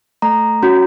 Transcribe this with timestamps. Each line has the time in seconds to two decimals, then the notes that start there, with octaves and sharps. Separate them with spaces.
0.22 A3 A#5
0.63 C#4 F#4